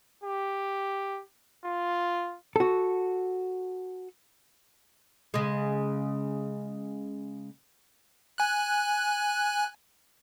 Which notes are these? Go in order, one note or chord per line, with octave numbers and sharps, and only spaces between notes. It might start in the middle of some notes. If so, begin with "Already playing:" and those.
G4
F4
F#4 A4
C#3 G#3
G#5 F#6